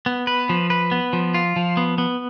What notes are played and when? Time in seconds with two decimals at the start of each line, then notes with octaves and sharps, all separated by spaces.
0.06 B3
0.27 B4
0.49 F3
0.70 B4
0.91 B3
1.13 F3
1.34 F4
1.56 F3
1.77 B3
1.98 B3